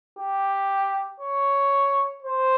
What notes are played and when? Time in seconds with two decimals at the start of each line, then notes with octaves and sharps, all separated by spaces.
0.19 G4
1.20 C#5
2.23 C5